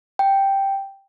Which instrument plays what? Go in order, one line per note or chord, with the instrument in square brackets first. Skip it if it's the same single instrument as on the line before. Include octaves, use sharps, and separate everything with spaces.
[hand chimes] G5